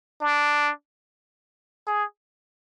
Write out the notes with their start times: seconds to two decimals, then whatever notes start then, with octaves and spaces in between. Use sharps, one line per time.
0.21 D4
1.87 G#4